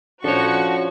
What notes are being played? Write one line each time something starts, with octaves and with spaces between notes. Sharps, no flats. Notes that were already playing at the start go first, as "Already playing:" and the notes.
F3 C#4 D4 F4 F#4 A4 C#5 C#6